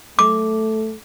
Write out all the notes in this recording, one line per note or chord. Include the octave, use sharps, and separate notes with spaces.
A3 D6